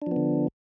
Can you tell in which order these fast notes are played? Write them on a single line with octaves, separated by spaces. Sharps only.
D4 F3 B3 D3